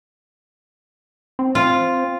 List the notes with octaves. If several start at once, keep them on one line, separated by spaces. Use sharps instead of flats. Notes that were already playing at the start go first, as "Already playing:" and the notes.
C4
F4